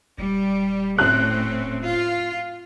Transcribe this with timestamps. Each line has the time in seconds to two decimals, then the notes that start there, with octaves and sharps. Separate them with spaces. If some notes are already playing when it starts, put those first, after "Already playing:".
0.18 D#1 G3
0.98 A2 C4 C#4 F#6
1.81 F4